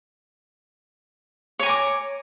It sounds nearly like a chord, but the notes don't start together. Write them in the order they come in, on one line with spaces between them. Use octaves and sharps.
C#5 G#5 A#5 D6